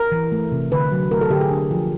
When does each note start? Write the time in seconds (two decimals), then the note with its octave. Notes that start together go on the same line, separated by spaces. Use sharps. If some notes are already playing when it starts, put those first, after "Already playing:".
Already playing: A#4
0.12 E3
0.32 A3
0.52 C3
0.71 D3 B4
0.91 F#3
1.11 A3 A#4
1.21 A4
1.31 D3 G4
1.41 G#4
1.51 D4
1.71 F3